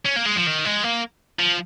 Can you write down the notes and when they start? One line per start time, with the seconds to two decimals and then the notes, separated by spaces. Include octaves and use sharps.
0.05 C#4
0.16 A#3
0.26 G#3
0.36 F3
0.46 D#3
0.65 G#3
0.83 A#3
1.39 F3